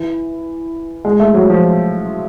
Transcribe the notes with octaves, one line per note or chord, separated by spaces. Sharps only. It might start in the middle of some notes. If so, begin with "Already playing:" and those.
Already playing: E3
G#3
A3
F#3
F3